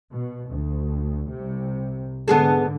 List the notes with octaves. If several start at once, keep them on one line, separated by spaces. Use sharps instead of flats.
B2
D2
C2 C3
G#2 D3 B3 G#4 A4